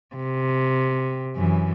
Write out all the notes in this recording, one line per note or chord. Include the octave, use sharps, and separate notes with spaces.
C3
F#2 E3